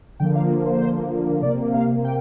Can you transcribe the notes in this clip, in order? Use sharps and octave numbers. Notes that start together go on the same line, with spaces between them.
D3 F3 A#3 G5
F5
C5
C3 A#3 D5
F5
G5